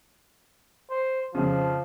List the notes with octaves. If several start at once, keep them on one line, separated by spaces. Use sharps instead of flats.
C5
F2 C#3 F3